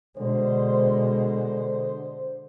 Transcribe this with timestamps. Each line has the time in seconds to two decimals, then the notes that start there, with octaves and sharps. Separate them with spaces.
0.17 B2 D3 G#3 C5